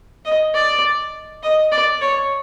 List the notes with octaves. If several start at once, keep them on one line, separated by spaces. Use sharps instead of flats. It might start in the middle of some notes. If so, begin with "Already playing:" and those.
D#5
D5
D#5
D5
C#5